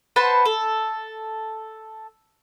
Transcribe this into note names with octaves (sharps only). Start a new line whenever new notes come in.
B4 C5 F#5 A5
A4